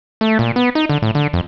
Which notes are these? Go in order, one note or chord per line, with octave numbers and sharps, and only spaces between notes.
A3
A#2
B3
D#4
D3
A2
D3
F2